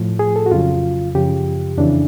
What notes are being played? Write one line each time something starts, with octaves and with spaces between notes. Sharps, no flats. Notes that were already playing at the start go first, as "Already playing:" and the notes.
Already playing: A2 F3
G#4
A4
F#4
F2 C#3 F#3 F4
F#2 C#3 F3 G4
F2 C#3 E3 D4